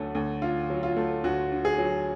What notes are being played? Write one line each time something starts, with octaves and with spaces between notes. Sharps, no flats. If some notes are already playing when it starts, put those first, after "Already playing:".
Already playing: D2 D3 F#3 A3
D2
D3 F4
F#3
F4
A3
D2 F#4
D3
G#4
F#3